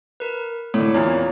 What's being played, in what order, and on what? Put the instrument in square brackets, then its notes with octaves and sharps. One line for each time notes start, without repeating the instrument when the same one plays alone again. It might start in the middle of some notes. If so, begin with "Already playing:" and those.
[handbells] A#4 B4
[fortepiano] A2 D3 [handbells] C#5
[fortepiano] E2 A#2 [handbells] C4 D#4 C#5